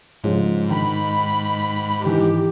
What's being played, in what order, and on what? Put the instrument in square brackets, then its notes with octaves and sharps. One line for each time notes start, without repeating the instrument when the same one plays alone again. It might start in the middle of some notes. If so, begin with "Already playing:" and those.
[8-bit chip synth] G#2 [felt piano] C#3 F3 G#3
[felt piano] D#3 [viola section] B5
[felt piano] D#3 E3 [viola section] G4